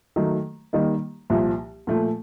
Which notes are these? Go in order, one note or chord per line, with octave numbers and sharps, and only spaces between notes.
D#3 F#3 A3
D#3 G3 A#3 D#4
C2 A#2 F3
A#2 F3 A3